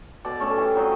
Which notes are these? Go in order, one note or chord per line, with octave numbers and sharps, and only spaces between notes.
B2 A4 D5
A3 C#4 A4
E3 G3
F#3 C4 F4 D#5